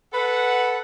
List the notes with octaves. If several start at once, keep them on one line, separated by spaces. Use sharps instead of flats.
A4 B4 F#5